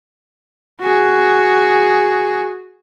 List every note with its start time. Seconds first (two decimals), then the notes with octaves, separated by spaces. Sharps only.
0.81 F#4 G#4